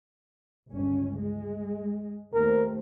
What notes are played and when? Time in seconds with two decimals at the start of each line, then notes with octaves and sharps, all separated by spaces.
0.71 G1 C#2 C#4
1.17 G#3
2.34 D#2 A3 C4 A#4